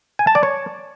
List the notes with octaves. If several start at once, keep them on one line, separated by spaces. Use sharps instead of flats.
G#5
A5
D5
C#5